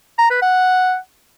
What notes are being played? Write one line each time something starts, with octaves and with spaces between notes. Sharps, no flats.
A#5
B4
F#5